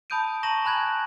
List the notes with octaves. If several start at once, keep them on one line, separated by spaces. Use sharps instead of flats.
A5 B5 D#6 G6 D7 D#7
A5 A#5 C#6 A#6 E7 F#7
G#5 B5 F#6 G#6 F#7